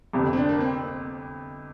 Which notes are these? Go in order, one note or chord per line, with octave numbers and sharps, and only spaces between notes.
G1 F2 C3
C4
D4
A#3
C4